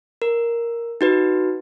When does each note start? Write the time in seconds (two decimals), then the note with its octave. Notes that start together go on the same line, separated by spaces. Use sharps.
0.22 A#4
1.01 D#4 F#4 B4